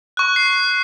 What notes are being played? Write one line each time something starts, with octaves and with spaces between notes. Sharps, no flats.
C#6 F#6
C7